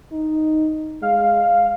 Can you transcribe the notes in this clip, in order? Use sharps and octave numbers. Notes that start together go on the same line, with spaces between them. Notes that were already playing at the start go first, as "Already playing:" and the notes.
D#4
G#3 F5